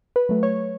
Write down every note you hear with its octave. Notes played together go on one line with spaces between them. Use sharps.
B4
F#3 A3
C#5